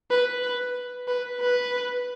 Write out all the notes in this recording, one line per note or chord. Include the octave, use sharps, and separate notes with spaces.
B4
B4
B4
B4